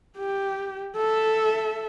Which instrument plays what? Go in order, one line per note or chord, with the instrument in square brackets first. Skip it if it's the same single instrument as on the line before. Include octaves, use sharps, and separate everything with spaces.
[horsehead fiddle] G4
A4 E5